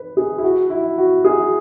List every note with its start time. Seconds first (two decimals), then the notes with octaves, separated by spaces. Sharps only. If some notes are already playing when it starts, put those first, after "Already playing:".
Already playing: B4
0.17 G#4
0.38 E4
0.44 F#4
0.70 E4
0.98 F#4
1.25 G#4